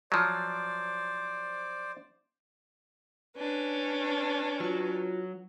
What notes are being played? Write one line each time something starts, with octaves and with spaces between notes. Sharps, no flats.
F3 F#3 C5 D5
C#4 D4 B4
F#3 F4 F#4